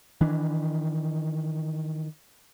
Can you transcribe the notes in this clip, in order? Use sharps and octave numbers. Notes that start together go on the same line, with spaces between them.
D#3 E3 D4